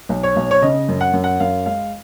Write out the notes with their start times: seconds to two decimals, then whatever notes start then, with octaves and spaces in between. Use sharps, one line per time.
0.09 B1
0.23 C#5
0.36 B1
0.51 C#5
0.62 C#3 D#5
0.89 F#2
1.01 F#5
1.13 F#2
1.24 F#5
1.40 F#2 F5
1.66 G#3 F5